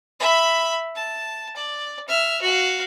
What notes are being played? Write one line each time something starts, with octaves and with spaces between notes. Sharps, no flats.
E5 B5
A5
D5
E5 F6
F#4 F5